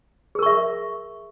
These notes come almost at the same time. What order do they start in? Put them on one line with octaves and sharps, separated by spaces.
G#4 A#4 C#6 E5